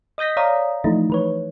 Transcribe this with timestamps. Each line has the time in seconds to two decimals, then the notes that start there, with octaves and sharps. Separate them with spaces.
0.18 D#5 D#6 G6 A#6 B6
0.37 C#5 D5 F5 A#5 D#6
0.84 E3 F3 A3 D#4 E4
1.10 E3 B4 C#5